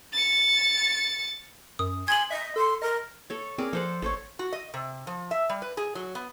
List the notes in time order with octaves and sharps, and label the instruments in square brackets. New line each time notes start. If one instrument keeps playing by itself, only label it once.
[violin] A6 C#7
[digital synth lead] F#2 [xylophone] D#6
[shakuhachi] G#5 [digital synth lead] C6 [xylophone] G#6 F#7
[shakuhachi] D#5 [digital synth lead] E5
[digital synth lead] A4 [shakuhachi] C6
[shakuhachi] A#4 [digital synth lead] D#5
[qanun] A4 C#5
[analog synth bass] C4 [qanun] G#4 A#4 D5
[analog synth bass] F3 [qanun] A4 C5 F#5
[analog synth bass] A1 [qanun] A4 C5 C#5
[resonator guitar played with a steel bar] F#4
D#5
C3
F3
E5
G3
B4
G#4
F#3
B3